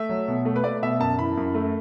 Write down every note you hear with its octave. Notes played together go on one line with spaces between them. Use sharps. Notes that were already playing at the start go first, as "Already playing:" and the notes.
Already playing: A3 E5
F#3
B2
A3
B4
A3 D5
B2 E5
F#2 A5
E3 B5
F#2
A3